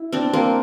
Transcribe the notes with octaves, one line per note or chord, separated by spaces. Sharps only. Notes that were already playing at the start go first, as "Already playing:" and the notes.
Already playing: E4
C4 D4
A#3 C4